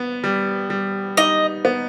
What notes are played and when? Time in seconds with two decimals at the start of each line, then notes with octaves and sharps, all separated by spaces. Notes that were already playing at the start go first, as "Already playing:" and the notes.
Already playing: B3
0.24 G3
0.70 G3
1.17 D#4 D#5
1.65 B3